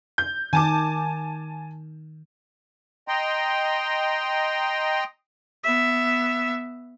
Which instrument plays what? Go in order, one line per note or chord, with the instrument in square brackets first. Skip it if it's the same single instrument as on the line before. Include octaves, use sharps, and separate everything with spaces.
[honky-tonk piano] G6
[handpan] D#3 [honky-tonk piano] G#5 A5 D6
[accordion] D#5 G5 A#5 C6
[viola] B3 E5